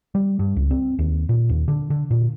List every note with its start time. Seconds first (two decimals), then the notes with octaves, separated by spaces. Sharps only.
0.15 G3
0.39 G2
0.56 C#2
0.71 C4
0.99 D#2
1.29 A#2
1.49 D#2
1.68 D3
1.90 D3
2.11 A#2